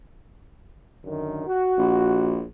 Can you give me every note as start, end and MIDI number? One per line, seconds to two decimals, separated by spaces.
1.05 1.45 42
1.05 1.45 50
1.05 1.45 51
1.47 2.42 66
1.78 2.46 34